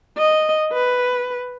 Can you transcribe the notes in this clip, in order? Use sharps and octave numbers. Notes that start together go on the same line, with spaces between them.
D#5
B4